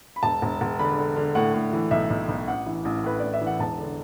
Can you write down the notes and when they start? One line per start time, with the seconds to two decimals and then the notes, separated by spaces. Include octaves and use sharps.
0.16 B5
0.23 E1 A5
0.42 E1
0.61 E1
0.79 D3 B5
0.98 D3
1.16 D3
1.35 A2 F#5
1.54 A2
1.73 E3
1.91 B1 E5
2.10 B1
2.28 B1
2.47 A1 F#5
2.66 E3
2.85 A1
3.04 A2 B4
3.19 A1 D5
3.33 E5
3.41 E3
3.47 F#5
3.59 E1 A5
3.78 D3